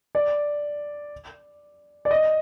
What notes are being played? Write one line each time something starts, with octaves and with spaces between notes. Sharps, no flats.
D5
D5
D#5